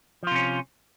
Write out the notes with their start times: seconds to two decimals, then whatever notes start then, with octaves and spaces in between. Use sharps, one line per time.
0.23 F3
0.27 F4
0.31 C3
0.35 C#4